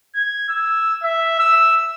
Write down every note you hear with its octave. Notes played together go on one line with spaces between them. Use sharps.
G#6
E6
E5
E6